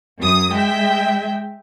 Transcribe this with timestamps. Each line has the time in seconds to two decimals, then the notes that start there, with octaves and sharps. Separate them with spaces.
0.20 F#2 D#6
0.54 G#3 E5 G5